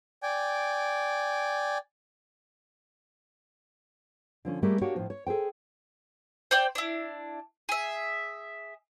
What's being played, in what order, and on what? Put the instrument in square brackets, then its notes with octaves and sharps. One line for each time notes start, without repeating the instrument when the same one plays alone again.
[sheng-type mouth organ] D5 G5 G#5
[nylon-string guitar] D3 F3 C#4
G3 A3 A#3 G#4 D#5
A#3 D4 F#4 G4 C#5
A2 F3
C#5
G#4 A4 C5 G5
[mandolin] C5 D5 G5
D4 E4
G#4 E5